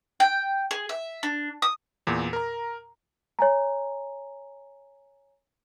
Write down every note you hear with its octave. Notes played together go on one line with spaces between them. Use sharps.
G5
G#4
E5
D4
D#6
E2 A#2
A#4 A#5
C#5 G#5 A#5